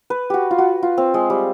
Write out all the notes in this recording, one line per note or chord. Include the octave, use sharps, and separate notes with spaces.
B4
F#4 G4
F4
F#4
F4
C4
G#3
G3